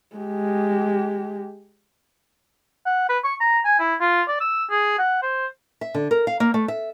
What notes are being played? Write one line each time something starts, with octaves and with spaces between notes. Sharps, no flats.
G#3 G4
F#5
B4
C#6
A#5
G#5
E4
F4
D5
E6
G#4
F#5
C5
E5
D3
A#4
F5
A#3
A3
E5